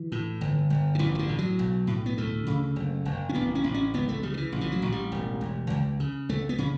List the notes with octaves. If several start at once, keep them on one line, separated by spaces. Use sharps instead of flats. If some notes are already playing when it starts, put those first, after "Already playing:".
Already playing: E3
A2
G1
G1
D3
A1 E3
E3
D3
A2
F#3
B1
A2
B3
D2 A3
C#3
F#1
F#1
C#4
A1 B3
C#4
A1
C#4
C#2 B3
A3
C#3 G3
D3
E3
A1
E3
F#3
A1
G3
E1
E1
C#2
C#3
C#2 A3
B3
C#3 C#4